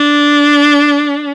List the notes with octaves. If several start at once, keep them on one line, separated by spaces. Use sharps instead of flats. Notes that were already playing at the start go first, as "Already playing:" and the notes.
Already playing: D4